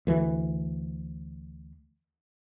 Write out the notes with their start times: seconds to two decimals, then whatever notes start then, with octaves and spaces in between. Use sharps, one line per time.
0.07 D2 E3